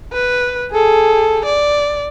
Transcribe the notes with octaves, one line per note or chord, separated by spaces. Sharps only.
B4
G#4 A4
D5